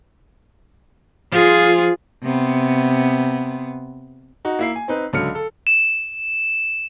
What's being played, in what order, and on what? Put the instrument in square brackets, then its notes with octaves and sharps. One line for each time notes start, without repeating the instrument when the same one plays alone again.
[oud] F3 [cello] F4 G#4
[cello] C3 B3
[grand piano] D#4 F#4
A#3 E4 C7
G#5
C4 D#4 B4
C#2 D3 F#3 F6 C#7
A4
[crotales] E7